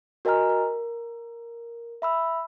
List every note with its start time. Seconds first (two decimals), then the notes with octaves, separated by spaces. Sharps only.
0.25 F#4 A#4 D#5 G#5 A#5 F6
0.49 A#4
2.02 E5 B5 E6